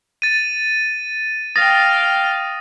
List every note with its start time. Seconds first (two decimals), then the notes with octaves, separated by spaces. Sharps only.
0.22 A6 D#7
1.56 F5 G5 D#6 A6 A#6